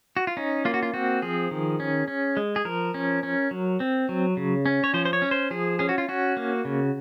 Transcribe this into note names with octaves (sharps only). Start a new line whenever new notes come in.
F#4
F4
C#4 D#4
A#3 F4
F#4
F4
C4 F#4
F3 G#4
D#3
C#4
C#4
G#3
G#4
F3 A#4
C#4
C#4
F#3
C4
F#3
C#3
C#4
C#5
F3 C5
C5
C#5
C#4
C5
F3 G#4
C#4 G#4
F#4
F4
C#4 F#4
A#3
C#3